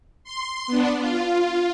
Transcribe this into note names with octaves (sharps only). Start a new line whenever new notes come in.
C6
B3 D4
F4